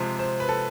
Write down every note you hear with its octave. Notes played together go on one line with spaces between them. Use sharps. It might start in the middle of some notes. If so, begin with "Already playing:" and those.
Already playing: C3 F3 G#3 C5
C5
B4
A4